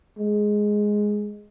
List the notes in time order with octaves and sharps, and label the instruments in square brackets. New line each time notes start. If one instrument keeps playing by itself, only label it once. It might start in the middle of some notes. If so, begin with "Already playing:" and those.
[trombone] G#3